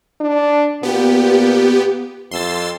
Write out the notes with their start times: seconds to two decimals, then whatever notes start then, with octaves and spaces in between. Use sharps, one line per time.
0.21 D4
0.83 A#2 B3 G4
2.31 F2 C6 E6 A6